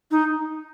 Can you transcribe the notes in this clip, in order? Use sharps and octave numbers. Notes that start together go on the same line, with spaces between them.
D#4